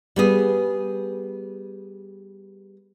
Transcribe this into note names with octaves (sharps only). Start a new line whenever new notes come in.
G3 B3 G#4